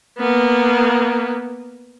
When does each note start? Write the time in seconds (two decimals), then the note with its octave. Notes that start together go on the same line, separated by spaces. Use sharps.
0.19 A#3 B3